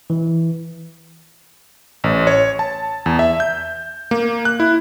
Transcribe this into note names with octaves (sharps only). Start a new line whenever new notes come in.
E3
A1
C#5
A5
E2
E5
G6
A#3
F#6
E4